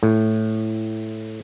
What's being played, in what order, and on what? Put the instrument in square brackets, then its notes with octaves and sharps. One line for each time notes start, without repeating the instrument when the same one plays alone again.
[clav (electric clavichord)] A2